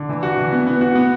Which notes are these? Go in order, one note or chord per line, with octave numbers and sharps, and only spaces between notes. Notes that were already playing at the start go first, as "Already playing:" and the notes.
Already playing: D3
E3
F#4
E3
B3
B3
F#4
B3